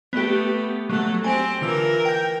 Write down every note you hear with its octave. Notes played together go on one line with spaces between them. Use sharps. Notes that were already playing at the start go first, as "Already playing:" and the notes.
A3 B3 G4
F#3 A3
C4 G4 G#5
D3 E3 F4 A#4 E6
G5 G6